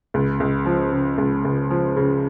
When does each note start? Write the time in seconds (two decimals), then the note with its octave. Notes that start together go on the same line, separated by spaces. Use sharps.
0.14 C#2
0.40 C#2
0.66 F3
0.92 C#3
1.18 C#2
1.45 C#2
1.70 F3
1.96 C#3